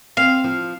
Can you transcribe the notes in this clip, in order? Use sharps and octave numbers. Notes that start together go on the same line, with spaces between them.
C4 F5
F3